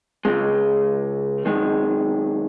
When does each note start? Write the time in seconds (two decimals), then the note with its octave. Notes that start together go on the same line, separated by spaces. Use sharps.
0.25 C#2 C#3 G#3
1.45 F#2 D#3 G#3